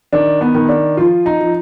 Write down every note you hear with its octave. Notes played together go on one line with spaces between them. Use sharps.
D#3 D4
B3
D#3
D4
F3 F4
D#4
F3